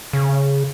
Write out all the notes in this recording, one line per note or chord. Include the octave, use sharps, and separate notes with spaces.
C#3